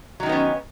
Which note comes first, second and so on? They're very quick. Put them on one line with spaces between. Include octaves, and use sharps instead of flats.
F#3 D#3 D#4 B3 C#4